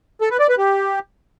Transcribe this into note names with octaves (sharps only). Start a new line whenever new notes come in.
A4
B4
D5
B4
G4